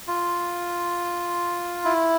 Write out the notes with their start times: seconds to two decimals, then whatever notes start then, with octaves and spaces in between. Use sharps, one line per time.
0.08 F4
1.85 E4